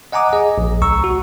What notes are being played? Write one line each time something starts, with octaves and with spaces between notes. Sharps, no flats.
D#5 F#5 G#5 A#5 D6 D#6
G#4 D#5 G#5
A#1
C#2 A#5 C#6 E6
F#4